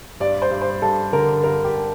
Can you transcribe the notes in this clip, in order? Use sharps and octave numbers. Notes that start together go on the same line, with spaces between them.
G2 D5
C5
G2
C5
G2 A4
D3 A#4
G2 A#4
G4